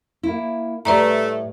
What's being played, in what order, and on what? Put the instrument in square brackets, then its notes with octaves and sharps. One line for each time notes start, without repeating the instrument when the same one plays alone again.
[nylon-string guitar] A#3 E4
[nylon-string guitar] A2 G3 [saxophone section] A3 [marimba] B4 D5 A#5